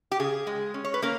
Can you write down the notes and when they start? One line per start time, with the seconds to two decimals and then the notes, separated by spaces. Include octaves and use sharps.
0.12 G4
0.20 C#3 G#4
0.47 G#3
0.74 C#4
0.84 C#5
0.94 B4
1.02 A#3 C#4 A#4